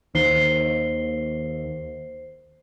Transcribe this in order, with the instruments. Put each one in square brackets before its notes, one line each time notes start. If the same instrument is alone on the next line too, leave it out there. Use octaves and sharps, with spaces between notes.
[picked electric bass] D#2 D#3 [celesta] C5 C7 G7